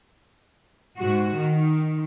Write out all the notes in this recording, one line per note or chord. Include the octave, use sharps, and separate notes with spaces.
G#2 F#4
D#3